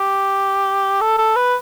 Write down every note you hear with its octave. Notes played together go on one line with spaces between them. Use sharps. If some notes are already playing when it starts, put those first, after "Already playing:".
Already playing: G4
A4
A4
B4